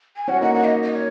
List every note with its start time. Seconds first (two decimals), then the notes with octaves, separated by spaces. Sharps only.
0.16 G#5
0.28 C#4 F#4 F#5
0.41 A#3 D#4 F#5
0.54 A#3 D#4 F#5
0.64 D#5
0.83 D#5
0.93 C#5